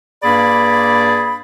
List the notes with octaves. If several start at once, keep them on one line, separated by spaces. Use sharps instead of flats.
G2 A#3 G#4 D5 B5